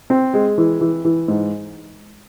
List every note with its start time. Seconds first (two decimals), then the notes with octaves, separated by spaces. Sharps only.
0.10 C4
0.34 G#3
0.58 E3
0.81 E3
1.05 E3
1.28 G#2